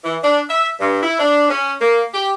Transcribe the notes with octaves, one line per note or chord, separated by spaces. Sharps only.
E3
D4
E5
G2
E4
D4
C#4
A#3
G4